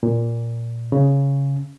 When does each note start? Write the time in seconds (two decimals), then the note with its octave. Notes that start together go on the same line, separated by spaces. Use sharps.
0.03 A#2
0.92 C#3